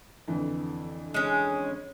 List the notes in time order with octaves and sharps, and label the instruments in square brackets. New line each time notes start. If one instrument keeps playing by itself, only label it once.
[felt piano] F2 D3 E3
[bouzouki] G#3 C#4